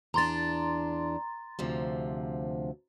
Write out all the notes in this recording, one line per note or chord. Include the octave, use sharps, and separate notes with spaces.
E2 D4 A#5 C6 A6
D2 C3 F3